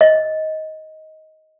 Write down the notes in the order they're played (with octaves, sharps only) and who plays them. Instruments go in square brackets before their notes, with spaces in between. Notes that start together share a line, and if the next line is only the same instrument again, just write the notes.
[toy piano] D#5